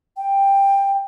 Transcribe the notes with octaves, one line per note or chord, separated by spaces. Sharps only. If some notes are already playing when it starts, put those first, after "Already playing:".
G5